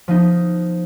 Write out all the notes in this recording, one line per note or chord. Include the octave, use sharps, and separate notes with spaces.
F3 B3 D#4